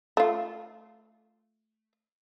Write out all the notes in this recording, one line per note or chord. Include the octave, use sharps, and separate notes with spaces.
A3 F4